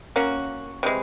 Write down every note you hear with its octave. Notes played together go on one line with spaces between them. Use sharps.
A#3 C#4 F#4
C3 E3 G#3